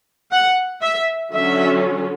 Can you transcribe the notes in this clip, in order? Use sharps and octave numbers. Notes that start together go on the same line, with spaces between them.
F#5
E5
D3 F#3 C#4 E5